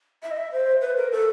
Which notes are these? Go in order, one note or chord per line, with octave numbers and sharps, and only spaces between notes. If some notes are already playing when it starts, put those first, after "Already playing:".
E5
D#5
E5
C5
B4
A#4
A4